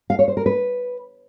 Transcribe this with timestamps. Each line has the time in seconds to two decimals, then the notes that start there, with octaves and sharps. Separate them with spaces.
0.10 F5
0.19 C#5
0.28 C5
0.37 A#4
0.46 B4